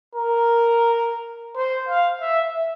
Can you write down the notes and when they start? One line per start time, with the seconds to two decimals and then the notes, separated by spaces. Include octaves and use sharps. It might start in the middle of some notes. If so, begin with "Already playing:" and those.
0.15 A#4
1.56 C5
1.89 F5
2.21 E5